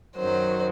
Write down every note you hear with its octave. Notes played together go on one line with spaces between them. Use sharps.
F#2 D#3 F#3 C5